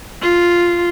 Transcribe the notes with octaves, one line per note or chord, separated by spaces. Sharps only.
F4